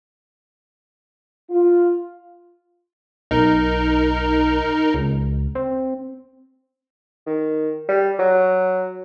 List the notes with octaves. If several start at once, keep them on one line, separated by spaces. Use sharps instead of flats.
F4
B1 D#4 A#4
C#2
C4
D#3
G3
F#3